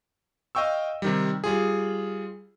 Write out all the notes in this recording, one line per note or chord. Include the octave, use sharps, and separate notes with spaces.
D#5 F5 G5 C#6 E6
C3 D#3 G3
G3 F4 G#4